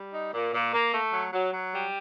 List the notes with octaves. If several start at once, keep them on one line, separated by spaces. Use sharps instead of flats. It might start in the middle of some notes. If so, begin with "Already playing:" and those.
Already playing: G3
D#4
A#2
A#2
A#3
A3
F#3
F#3
F#3
G3